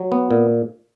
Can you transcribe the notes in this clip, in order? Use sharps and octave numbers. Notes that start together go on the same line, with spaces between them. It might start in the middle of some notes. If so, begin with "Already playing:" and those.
Already playing: F#3
B3
A#2